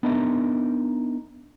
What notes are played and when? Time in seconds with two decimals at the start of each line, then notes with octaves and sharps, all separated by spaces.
0.03 B3 D4 D#4 A#4 D#5 E5